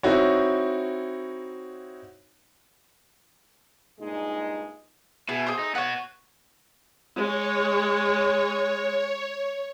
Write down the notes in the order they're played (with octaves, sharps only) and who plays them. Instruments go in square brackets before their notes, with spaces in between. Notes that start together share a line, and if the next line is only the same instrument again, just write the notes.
[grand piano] C4 D#4 E4 F#4 C#5
[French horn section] G2 A#2 G#3 D#4
[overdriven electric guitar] B2 [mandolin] E4 G#4
[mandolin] G#4 A4 C5
[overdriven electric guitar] D#4
[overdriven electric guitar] B3 F#4 [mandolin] C#5 F#5
[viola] G#3 [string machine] C#5